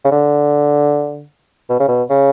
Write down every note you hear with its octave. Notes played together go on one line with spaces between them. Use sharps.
C#3
D3
B2
C#3
B2
C#3